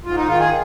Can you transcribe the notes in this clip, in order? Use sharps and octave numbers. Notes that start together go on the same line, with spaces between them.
G#2 F4
D#4
D#3 F4
G#4